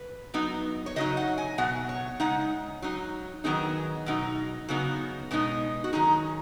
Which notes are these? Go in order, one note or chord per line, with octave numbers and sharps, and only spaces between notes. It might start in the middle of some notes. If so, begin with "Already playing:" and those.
Already playing: B4
F#3 B3 D#4
C#5
C#3 F#3 D#4 D#5
F#5
G#5
B2 F#3 B3 F#5
C#5
C#3 G#3 D#4 F#5
F#3 D#4
D#3 F#3 B3 D#4 G#4
B2 F#3 D#4
C#3 F#3 B3 D#4 F#4
B2 G#3 B3 D#4
F#4
D#3 F#3 D#4 G#4